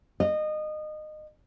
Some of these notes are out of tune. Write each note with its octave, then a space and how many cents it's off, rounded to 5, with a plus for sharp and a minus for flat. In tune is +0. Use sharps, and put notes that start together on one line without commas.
D#5 -25